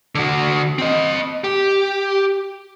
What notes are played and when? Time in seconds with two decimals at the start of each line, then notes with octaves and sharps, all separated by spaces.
0.15 D3 F#4
0.79 C4 D#5
1.44 G4